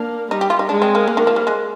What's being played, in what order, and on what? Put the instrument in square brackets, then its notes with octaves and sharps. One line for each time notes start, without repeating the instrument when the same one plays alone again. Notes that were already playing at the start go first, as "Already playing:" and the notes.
Already playing: [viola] A#3 [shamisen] D4
[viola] G3 [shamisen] D#4
[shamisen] G4
F4
D#4
[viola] G#3 [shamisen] D4
[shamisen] C4
A#3
[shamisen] G#3 [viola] A#3
[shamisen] D#3
F3
G3
G#3